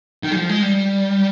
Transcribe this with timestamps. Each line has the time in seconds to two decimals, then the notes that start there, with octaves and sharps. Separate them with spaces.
0.23 D#3
0.31 G3
0.36 F3
0.49 G#3
0.62 G3